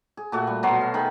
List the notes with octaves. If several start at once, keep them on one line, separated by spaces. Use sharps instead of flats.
G#4
A#2 A3 F#4
G3
B2 F#3 C6
F5
D#3 G#4 B5